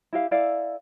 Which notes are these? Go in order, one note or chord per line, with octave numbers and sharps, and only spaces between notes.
E4 G4 F5
E4 A4 D5 F5